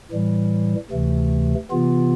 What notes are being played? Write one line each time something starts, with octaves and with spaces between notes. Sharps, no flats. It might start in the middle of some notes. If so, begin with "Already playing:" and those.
A2 E3 G3
D2 C3 E3 A3
C3 E3 B3 F4